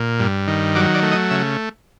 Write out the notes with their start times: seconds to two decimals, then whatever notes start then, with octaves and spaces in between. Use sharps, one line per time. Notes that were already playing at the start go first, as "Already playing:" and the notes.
Already playing: A#2
0.20 G2
0.48 D#3
0.75 F#3 D5
0.94 D5
1.02 A3
1.11 D#5
1.30 C#3 E5